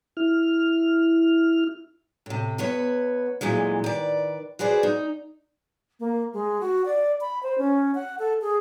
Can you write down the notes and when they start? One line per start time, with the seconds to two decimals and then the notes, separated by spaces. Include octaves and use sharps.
0.17 E4 F6
2.26 A2 C3
2.58 E2 B3 B4 C#5
3.41 D2 A#2 E3 F#3 G#3
3.84 D#3 B4 D5
4.59 F#4 G#4 B4 C5 D5
4.83 D#4
6.00 A#3
6.33 G#3
6.61 F#4
6.85 D5
7.21 B5
7.43 C5
7.58 C#4
7.95 F#5
8.19 A4
8.41 G#4